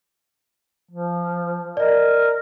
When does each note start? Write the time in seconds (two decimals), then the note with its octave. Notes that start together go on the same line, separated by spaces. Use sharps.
0.91 F3
1.77 A#4 D5 D#5